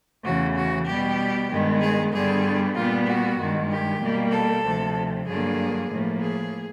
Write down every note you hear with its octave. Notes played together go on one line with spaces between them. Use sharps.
E2 C#3 E3 A3 F#4
F#4
B2 G3 B3 G4
G2 D#3 G#3 B3
G#4
G2 D3 G3 B3 G#4
A#2 G3 B3 F4
F#4
G2 D#3 G#3
G4
B2 G3 A#3
A4
D2 C3 F3
G2 D3 F#3 A#3 G#4
A2 F3 A#3
G#4